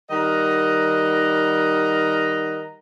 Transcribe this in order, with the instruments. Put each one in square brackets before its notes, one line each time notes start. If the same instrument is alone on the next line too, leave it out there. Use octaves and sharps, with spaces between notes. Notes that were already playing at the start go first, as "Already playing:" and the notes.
[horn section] D#3 G3 A#4 D#5 F#5 A#5